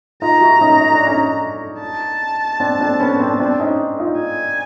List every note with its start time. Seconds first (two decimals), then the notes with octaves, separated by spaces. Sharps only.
0.22 D#4 F4 A#5
0.41 E4 F#4
0.61 C#4 D#4
0.81 D#4
0.94 D4
1.07 C#4 D#4
1.80 A5
2.60 C4 D4
2.80 C4 D4
3.00 B3 C#4
3.20 C4 D4
3.40 C4 D4
3.60 C#4 D#4
4.00 D#4 F4
4.20 G#5